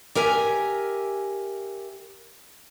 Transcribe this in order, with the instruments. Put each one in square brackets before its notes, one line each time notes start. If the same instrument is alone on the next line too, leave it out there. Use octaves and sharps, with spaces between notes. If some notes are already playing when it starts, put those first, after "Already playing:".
[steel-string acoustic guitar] G4 A#4 E5 G#5